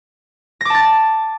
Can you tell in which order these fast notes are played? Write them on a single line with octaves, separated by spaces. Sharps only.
A#6 D6 A5 A6